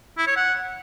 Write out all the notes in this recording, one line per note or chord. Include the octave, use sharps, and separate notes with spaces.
E4
C#5
F#5